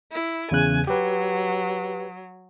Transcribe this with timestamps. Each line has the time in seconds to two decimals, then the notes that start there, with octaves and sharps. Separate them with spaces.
0.12 E4
0.51 E2 C#3 G#5 F#6
0.87 F#3 G4 B4